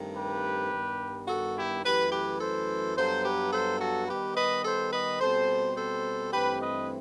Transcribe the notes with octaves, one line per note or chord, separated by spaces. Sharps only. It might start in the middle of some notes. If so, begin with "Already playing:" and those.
Already playing: G2 D#3 A3 C4
G4 B4
G2 D#3 G3 B3
F#4 A4
E4 G4
F#2 E3 A3 G4 B4
G4 B4
A4 C5
G2 F#3 B3 A4 C5
G4 B4
A4 C5
F#4 A4
D#3 G3 B3 G4 B4
B4 D#5
A4 C5
B4 D#5
B2 G3 C4 A4 C5
A4 C5
G2 E3 A3 C4 G4 B4
B4 D#5